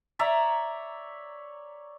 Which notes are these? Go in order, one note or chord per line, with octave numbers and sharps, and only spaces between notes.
C#5 D5 E5 A#5